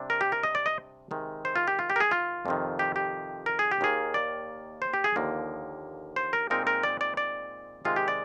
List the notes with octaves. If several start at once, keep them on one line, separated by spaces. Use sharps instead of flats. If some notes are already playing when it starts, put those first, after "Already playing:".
Already playing: C3 G3 D4
A#4
G4
A#4
D#5
D5
D#5
C3 D#3 G#3
C5
F4
G4
F4
G4
A#4
G#4
F4
F2 C3 D#3
G4
G4
A#4
G#4
G4
D#2 D#3 A#3 G#4
D5
C5
G4
G#4
D#2 D3 F3 A#3
C5
A#4
A#2 G#3 C4 D#4 A#4
A#4
D5
D5
D5
C3 D#3 G#3 F4
G4
D5